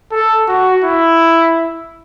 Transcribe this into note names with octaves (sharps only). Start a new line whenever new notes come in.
A4
F#4
E4